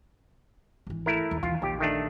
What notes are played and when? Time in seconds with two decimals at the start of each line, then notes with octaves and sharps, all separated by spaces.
0.87 G#1 E3
1.06 A3 E4 A#4
1.31 D#2
1.43 D#2 E3 F4
1.62 A#1 D#2 G4
1.80 D#3 A3 D4